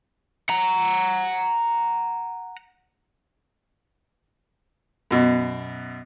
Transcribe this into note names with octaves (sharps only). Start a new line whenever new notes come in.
F#5 A#5
F#2 B2